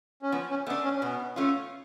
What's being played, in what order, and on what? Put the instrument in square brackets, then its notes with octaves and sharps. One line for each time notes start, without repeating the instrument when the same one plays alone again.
[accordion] C#4
[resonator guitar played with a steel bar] F3 [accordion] B3
[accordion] C#4
[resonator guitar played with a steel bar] A3 [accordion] B3
[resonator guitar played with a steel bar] D4
[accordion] C#4
C#4
[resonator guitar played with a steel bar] B2 [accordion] B3
[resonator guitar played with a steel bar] A3 C#4 F4